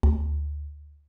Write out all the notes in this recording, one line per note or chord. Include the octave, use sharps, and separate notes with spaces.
D2